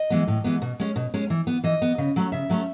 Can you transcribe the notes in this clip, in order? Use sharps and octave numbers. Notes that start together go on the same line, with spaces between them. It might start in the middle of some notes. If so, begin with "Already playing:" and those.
Already playing: D#5
E3 G#3 B3
A2
E3 G#3 B3
B2
G#3 C#4
B2
G#3 C#4
E3
B3
E3 D#5
B3
C#3
F#3 A3 C#4
C#3 E5
F#3 A3 C#4